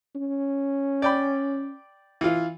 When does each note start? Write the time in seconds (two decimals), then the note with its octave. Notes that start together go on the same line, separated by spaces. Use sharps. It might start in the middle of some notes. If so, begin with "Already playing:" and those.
0.15 C#4
1.02 D5 G5 B5
2.21 E3 F4